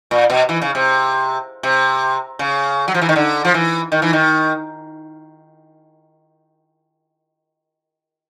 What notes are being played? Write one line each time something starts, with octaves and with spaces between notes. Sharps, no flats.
A#2
B2
E3
C#3
C3
C3
C#3
F#3
F3
E3
D#3
D3
F3
E3
D#3
E3
D#3